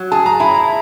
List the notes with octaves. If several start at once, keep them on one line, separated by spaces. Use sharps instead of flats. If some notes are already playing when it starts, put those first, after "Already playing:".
Already playing: F#3
G#4 A5
A#5
E4 B5
A#5